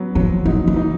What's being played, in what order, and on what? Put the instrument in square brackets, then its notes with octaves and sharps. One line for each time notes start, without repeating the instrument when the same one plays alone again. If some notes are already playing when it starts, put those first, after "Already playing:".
Already playing: [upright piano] F#3 B3
[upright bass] F3 [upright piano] F#3
[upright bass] F3 [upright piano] D#4
[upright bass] E3
[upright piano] D#4